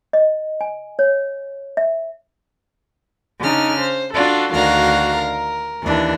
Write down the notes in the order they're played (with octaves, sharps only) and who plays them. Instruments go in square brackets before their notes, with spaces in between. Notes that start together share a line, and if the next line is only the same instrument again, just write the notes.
[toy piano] D#5
G#5
C#5
E5
[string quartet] C#3 D4 D#4 F6
C5
D4 F4 F#4 A4
D2 D#3 D4 F#4 F5 A#5
A#4
D#2 E3 D4